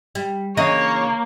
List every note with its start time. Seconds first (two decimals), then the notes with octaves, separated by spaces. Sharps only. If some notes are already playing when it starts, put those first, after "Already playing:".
0.15 G3
0.57 C#3 E3 A#3 C#5 D#5